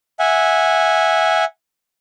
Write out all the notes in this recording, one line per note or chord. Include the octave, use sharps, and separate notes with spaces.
E5 F#5 G#5